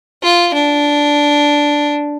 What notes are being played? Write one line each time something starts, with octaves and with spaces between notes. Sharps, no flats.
F4
D4